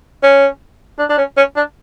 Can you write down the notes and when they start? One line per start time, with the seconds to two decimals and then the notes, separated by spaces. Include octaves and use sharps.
0.23 C#4
0.99 D4
1.10 D4
1.18 C#4
1.37 C#4
1.56 D4